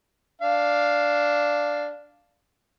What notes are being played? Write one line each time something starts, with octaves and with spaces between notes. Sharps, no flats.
D4 F5